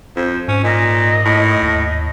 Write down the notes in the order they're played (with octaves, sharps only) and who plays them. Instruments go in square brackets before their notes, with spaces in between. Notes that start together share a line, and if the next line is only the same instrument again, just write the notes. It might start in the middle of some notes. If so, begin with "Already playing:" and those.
[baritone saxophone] F2 [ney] C5
[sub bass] G#2 [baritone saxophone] C#4
[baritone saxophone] A#2 [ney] D#5
[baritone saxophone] A2
[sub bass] D#2